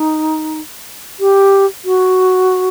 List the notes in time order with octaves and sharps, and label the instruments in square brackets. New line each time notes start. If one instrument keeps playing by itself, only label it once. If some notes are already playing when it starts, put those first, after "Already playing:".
Already playing: [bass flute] D#4
G4
F#4